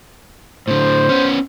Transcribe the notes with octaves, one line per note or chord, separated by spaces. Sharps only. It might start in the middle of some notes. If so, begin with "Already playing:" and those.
A2 D3 C5
B3 C#4